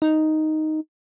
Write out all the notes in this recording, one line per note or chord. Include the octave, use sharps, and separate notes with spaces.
D#4